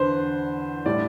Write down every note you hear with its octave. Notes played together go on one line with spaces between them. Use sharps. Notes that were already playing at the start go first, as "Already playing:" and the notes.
Already playing: E2 D3 B4 C5
A2 G3 D5